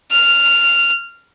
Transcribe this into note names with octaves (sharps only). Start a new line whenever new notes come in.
F6